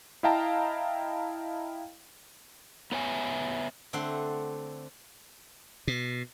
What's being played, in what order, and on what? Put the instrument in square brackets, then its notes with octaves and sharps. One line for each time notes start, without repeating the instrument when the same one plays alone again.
[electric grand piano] E4 D#5 F5 G5 A5 A#5
[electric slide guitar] B3 B4 C#5 E5 G#5
[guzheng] D3 A3 C4 C5 F#5 C6
[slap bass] B2